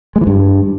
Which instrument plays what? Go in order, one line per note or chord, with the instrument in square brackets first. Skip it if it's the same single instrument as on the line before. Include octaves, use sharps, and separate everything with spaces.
[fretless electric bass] G#3
E3
G2